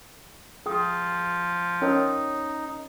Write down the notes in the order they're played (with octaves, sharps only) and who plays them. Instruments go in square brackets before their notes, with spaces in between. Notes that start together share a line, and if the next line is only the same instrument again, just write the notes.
[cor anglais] F3 [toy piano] G#4 G5 D#6
[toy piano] C#4 A#4 C#5 [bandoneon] D#4